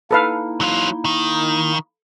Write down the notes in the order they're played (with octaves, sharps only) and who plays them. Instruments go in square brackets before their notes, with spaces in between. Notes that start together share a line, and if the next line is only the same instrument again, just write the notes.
[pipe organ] A#3 D#4 E4 [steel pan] A4 B4 F5
[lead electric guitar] F#3 F4
D#3